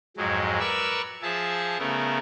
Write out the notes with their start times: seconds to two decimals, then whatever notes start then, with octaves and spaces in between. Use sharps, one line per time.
0.17 F2 G#2 F#3 G#3
0.60 A#4 B4 D5 C#6 E6
1.22 F3 G#4 E5 A5
1.79 C#3 A3 B3 A#4